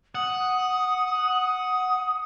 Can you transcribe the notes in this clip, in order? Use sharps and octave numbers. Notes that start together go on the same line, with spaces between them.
F#5 D#6